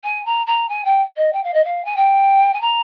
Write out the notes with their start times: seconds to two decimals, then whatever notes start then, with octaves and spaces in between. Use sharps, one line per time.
0.04 G#5
0.26 A#5
0.47 A#5
0.69 G#5
0.85 G5
1.17 D#5
1.33 G5
1.44 F5
1.54 D#5
1.64 F5
1.85 G#5
1.96 G5
2.54 G#5
2.61 A#5